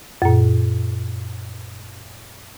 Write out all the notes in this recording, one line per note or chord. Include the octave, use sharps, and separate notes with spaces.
F#2 A#2